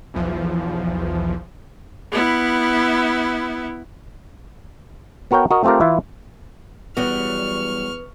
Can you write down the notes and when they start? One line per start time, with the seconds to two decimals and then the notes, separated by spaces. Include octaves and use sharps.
0.14 B1 E2 E3 F3
2.12 B3 E4
5.31 B3 F#4 A#4 C#5 G5
5.51 F#4 A#4 D#5
5.63 A3 C4 F4 G4 A#4
5.80 E3 E4 F4
6.97 E2 F#3 G3 B3 F#4 C#6 F6